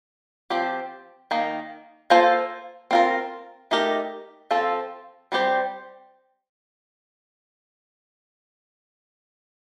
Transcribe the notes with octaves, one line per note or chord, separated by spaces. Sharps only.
F3 C4 G4
D#3 A#3 D#4
A#3 F4 A4 C5
C4 F4 A#4
A3 D#4 G4 A#4
F3 C4 F4 A4
G3 C4 G4 C5